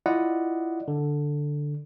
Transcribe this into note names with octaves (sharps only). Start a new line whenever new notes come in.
E4 F4 D5 D#5 F#5
D3